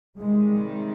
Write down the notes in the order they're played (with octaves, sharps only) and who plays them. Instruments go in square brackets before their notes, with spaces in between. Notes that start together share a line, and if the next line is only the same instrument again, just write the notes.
[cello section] C3 D#3 G3 [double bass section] G#3